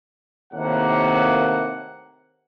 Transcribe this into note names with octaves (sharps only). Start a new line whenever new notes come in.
D#2 A2 C3 A#3 F#5